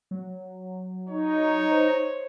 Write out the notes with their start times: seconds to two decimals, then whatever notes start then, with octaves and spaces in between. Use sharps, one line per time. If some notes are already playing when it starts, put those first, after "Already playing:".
0.11 F#3
1.09 D#4 C#5
1.72 C5